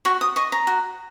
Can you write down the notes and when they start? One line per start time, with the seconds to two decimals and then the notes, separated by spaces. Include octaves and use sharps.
0.05 F#4 C#6
0.21 D#6
0.36 D#5 C#6
0.52 A#5
0.67 F#4